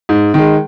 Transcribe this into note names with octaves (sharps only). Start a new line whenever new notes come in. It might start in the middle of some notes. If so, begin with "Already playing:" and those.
G#2
D#3 G#3